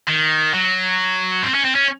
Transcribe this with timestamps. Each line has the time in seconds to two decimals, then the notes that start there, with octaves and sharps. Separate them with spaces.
0.09 D#3
0.54 F#3
1.42 C4
1.54 C#4
1.65 C4
1.75 C#4